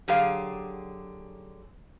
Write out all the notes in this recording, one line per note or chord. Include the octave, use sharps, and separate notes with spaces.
D3 F#3 G4 G#4 F5